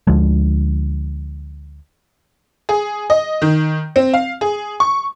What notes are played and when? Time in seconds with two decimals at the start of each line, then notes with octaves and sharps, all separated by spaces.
0.07 D2 D3 F3 G#3
2.69 G#4
3.10 D#5
3.42 D#3
3.96 C4
4.14 F5
4.41 G#4
4.80 C#6